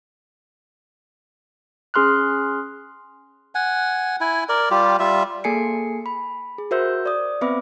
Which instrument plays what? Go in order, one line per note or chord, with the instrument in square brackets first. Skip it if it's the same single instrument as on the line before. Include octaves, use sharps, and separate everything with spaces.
[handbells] C#4 G#4 C6 F6 F#6
[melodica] F#5 G#5
E4 G#5
A#4 D5
G3 F4 G4
G3 F4 E5
[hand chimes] A#3 G#4 A4 G#5 C7 C#7
B5
G#4
F#4 A#4 C5 E5 E6 G6
D5 D#6
B3 C4 B4 E5 B5 D6